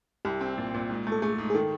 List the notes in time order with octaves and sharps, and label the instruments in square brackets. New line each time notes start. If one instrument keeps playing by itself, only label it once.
[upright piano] C2 [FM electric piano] G4
[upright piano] C4
A#2
A#2
G#2
A3
[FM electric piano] A4
[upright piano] A3 [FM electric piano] G#4
[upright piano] G#2
[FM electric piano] G#4
[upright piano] D#3 [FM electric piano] A4